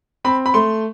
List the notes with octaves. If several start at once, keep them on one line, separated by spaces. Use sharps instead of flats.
C4 B5
B5
A3 C6